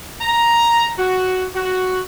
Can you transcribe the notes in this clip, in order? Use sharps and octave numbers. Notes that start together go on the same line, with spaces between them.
A#5
F#4
F#4